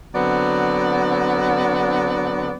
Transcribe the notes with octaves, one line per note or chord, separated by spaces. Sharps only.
D3 F#3 B3 C4 D5